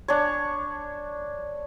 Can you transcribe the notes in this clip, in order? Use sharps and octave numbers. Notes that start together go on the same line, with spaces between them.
D4 C#5